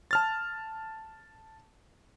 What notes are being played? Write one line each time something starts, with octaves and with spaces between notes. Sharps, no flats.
A5 F6 A6